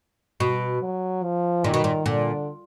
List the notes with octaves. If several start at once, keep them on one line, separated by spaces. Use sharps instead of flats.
B2
F#3
F3
A#2 D#3
B2
A#2
A#2 D3